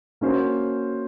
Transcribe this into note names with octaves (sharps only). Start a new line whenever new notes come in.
A#3 C#4 F#4 C5